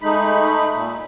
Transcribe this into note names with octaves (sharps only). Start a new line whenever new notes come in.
G#3 A3 D#4 B5
A#2